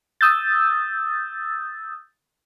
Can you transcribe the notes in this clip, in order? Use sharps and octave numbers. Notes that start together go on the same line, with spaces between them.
D#6 E6 G6 A6